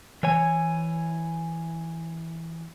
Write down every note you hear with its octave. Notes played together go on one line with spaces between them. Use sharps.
E3 C#5 G#5